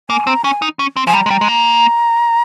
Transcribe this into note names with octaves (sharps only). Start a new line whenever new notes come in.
A#3 G#5
C4 A#5
C#4 G#5
D#4
C#4
C4
F3 G#5
G3 A#5
G#3
G3
G#3
A#3